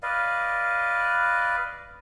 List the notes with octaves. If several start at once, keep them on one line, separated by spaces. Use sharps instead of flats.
B4 D5 D#5 F5